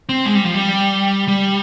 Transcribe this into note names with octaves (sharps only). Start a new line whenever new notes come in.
C4
G#3
G3
F3
G3
G3